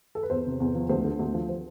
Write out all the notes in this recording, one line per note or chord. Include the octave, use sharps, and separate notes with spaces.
A4
B4
E2 C5
C3
E2
F3
D2 C5
D3
D2
F3
C5